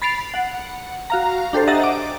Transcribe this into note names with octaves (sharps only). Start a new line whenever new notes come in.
B5 A6 C7 D7 F7
F#5
F#4 F5 A#5
D4 G4 A4 C5
D#5 E5 F#5 A#5 A6
D6